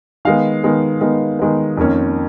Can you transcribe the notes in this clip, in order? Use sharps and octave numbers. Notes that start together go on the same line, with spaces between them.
D#3 G#3 B3 F5
D#3 G#3 B3
D#3 G#3 B3
D#3 G#3 B3
F2 D#3 A#3 C#4